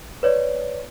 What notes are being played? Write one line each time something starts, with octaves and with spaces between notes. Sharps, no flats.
B4 C#5 D5